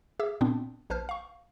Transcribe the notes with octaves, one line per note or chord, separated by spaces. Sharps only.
G#4 E5 D6 E6
A#2 B3 C4 D4
A#1 B4 C5 A5 F6 G6
F5 C#6